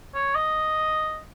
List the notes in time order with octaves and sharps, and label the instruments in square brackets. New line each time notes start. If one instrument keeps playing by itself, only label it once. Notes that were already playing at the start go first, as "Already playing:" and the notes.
[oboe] C#5
D#5